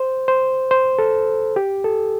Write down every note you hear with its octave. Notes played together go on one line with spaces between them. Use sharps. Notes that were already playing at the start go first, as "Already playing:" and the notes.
Already playing: C5
C5
C5
A4
G4
A4